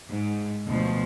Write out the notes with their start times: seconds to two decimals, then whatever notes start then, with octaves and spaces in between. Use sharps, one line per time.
0.10 G#2
0.67 D2 B2 F3